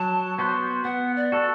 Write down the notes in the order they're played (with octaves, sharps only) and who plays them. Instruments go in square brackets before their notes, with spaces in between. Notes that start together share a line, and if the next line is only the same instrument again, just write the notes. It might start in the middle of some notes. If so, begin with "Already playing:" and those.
Already playing: [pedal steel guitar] F#3 [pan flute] A5
[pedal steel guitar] B3 F#4 C5
[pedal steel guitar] B3 [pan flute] F#5
[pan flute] D5
[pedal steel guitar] F#4 A4